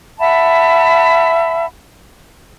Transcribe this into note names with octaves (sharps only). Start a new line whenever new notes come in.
E5 F#5 A5 B5